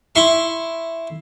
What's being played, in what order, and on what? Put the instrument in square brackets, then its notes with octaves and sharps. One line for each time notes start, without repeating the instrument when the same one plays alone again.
[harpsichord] E4 C6 C#6